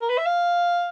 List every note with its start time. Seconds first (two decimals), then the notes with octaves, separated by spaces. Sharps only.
0.01 A#4
0.09 B4
0.18 E5
0.26 F5